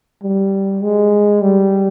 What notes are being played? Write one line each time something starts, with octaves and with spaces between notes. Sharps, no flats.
G3
G#3
G3